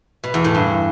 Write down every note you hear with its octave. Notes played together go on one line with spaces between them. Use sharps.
B2
E2
A2
G2